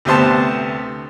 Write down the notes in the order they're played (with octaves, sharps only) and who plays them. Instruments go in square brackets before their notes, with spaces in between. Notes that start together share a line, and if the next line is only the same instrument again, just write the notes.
[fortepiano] D2 C3 B3 C5 A5